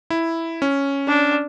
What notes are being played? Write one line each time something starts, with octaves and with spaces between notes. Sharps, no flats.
E4
C#4
D4